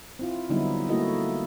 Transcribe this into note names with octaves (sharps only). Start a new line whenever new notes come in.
C4 E4 F4
D3 F#3 G3 B3 D#4 E4
A3 A#3 E4 F#4 A4 D#5